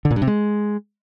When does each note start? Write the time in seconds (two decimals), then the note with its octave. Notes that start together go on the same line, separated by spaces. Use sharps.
0.05 D3
0.11 A#2
0.16 G2
0.22 C3
0.27 G#3